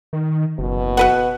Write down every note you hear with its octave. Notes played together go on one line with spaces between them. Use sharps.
D#3
F#1 B2
F#4 B4 F#5